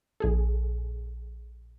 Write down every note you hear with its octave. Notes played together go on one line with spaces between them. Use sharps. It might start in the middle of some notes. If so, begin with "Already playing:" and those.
A#1 G#4 A4